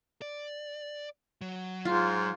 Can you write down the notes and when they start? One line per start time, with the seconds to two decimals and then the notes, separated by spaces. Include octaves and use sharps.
0.22 D5
1.41 F#3
1.85 G#2 F4